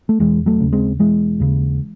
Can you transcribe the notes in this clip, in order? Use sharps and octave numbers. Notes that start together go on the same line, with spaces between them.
A3
E1 E3 G#3
F#3 A3
D#2 C#3
G#3 C4
E1 E3 G#3
D#2 C#3